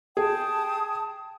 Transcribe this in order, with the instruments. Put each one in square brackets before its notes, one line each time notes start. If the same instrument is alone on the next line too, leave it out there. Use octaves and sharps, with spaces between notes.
[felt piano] G#4 [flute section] G5 A5 D#6